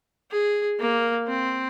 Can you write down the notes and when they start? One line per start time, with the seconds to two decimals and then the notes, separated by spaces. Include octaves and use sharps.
0.31 G#4
0.80 A#3
1.28 C4